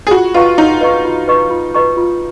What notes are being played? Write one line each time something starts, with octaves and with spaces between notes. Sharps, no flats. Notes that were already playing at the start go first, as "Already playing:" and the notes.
G#4
F4 F#4
F4 B4 D#5 A#5 C#6
D#4 F4
B4 D#5 A#5 C#6
F4
B4 D#5 A#5 C#6
F4
B4 D#5 A#5 C#6
F4